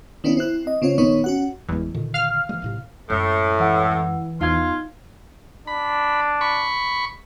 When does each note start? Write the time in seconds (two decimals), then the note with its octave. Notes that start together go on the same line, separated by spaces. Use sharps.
0.24 D#3 B3 C#4 D4 E4
0.37 C4 E4 F#6
0.67 D#5
0.82 C#3 C4 F4 C#5
0.98 A#1 D#3 B3 D#4 C#5 C#6
1.24 C#4 F#4 F#5
1.69 G1 E2 G#3
1.94 A#2 D3 D#3
2.14 F5 F6
2.49 E3 G#3
2.62 B1 A2 C3
3.10 F#2 A2 G#3
3.59 E3 F#5 E6
4.41 E2 D#4 F4 G#6
5.67 D4 B5
6.41 B5 C#6